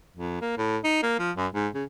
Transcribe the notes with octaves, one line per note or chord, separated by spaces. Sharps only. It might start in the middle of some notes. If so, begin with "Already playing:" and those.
F2
A#3
A2
D#4
A#3
F3
F#2
G#2
C#3